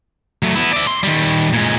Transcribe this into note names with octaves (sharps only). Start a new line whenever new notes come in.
F#3 A3
B3 E4
D5 E5
C6
D#3 G3
A#2 G#3